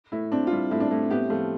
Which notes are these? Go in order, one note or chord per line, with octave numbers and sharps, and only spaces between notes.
A2 E4
C4 D4
F4
G3 E4
A2 E4
D4
A2
B3 G4
F3 A3